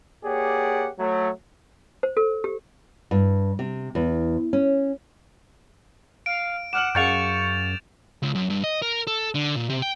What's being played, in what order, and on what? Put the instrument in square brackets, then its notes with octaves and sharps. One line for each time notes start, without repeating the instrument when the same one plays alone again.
[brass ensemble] A#3 G4 G#4 C#5 D5 F#5
F#3 A3
[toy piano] C5
A4
G4
[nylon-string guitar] G2
C3
E2
C#4
[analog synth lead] F5 [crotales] D7
[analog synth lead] F#5 [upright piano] D6 F6 F#7 [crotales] E7
[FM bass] F#2 [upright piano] G#4 F5 F#5 [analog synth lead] C#6 [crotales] G6 A6 F7
[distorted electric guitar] C#2
F#2
G2
D#5
A#4
A4
D3
A#2
C3
G5